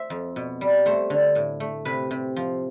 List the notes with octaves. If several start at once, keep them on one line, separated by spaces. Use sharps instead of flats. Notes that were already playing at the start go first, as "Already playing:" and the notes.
Already playing: C5 E5
F2
B2
G3
A3 C5
D3
A2
A3
C3 B4
C3
F3